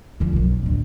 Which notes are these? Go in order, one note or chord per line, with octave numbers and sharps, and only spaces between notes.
D3 F3
B1 F#2
A1 D2